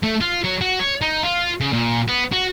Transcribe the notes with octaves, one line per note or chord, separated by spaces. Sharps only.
A3
F4
F#3
F#4
C#5
D#4
F4
C#3
A#2
B3
F#4